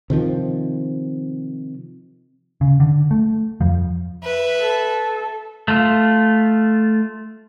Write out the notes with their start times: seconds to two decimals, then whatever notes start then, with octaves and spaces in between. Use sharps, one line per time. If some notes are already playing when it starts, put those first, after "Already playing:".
0.10 C3 D#3 F3
2.61 C#3
2.80 D3
3.11 A3
3.61 F2 F3
4.23 B4 E5
4.60 A4
5.68 A3 F4